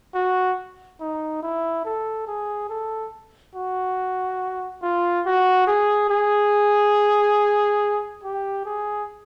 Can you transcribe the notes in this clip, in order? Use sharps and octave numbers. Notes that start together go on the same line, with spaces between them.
F#4
D#4
E4
A4
G#4
A4
F#4
F4
F#4
G#4
G#4
G4
G#4